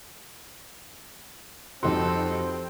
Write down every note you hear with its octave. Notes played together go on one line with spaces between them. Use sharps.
F2 G3 C4 D#4 F#4 A4 C6